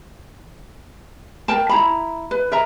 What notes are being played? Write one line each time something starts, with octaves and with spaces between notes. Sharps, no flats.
A#4 G5 A5
E4 A#5 B5
B4
A#4 E5 A#5